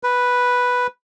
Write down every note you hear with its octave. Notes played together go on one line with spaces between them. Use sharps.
B4